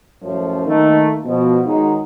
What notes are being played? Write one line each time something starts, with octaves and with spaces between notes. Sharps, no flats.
F#2 A2 F3
D#3 A3 A#3
B2 F3
D#3 F#3 G#3 D#4